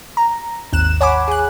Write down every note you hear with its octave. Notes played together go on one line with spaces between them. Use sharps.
A#5
G#1 D#2 F#6 E7
C#5 F#5 G#5 B5 D6
G#4 F#6